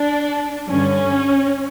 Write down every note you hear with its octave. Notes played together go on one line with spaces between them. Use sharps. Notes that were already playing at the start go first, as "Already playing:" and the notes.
Already playing: D4
G2 D3 C#4